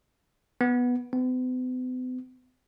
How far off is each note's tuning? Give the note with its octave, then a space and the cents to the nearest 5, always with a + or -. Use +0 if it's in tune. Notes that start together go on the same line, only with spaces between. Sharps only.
B3 -5
B3 +45